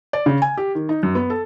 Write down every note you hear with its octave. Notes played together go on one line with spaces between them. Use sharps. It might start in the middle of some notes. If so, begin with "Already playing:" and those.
D5
C#3
G#5
G4
D#3
D#4
F#2
B3
A4